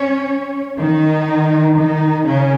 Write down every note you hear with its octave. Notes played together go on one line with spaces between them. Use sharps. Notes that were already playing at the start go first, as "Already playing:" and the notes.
Already playing: C#4 C#5
D#3 D#4
D#3 D#4
C#3 C#4